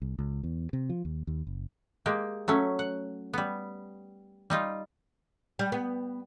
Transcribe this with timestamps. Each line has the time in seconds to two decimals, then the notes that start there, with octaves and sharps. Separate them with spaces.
0.02 C2
0.19 C#2
0.43 E2
0.73 C3
0.89 F3
1.05 D#2
1.27 D#2
1.47 F#1
2.06 G#3 A#3 G4
2.48 F#3 A3 C#4
2.79 F#5
3.33 G3 B3
4.50 G3 D#4 F4
5.59 G3
5.72 B3